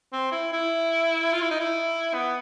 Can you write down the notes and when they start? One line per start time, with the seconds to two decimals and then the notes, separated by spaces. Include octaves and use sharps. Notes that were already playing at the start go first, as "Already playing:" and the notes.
0.12 C4
0.32 E4
0.53 E4
1.33 F4
1.42 E4
1.51 D#4
1.60 E4
2.14 B3